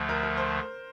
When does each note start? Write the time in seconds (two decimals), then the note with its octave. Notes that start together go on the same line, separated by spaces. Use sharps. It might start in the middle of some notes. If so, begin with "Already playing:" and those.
Already playing: D2 D3 F3 A3
0.09 A#4
0.23 A#4
0.37 C5